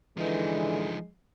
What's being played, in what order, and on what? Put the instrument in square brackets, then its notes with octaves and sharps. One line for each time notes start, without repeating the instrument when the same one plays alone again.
[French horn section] D3 E3 [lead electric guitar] F3 D#4 [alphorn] G#3